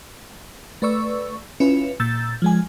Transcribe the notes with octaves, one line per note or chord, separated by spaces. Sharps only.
A3 B4 D5 C#6 E6
C#4 E4 F4 B4
A#2 E6 G6 A6
F3 G#3 G#5